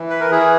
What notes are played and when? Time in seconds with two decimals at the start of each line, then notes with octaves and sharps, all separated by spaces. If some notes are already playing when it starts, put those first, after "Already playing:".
Already playing: E3
0.10 B4
0.20 A#4
0.31 E3 G#4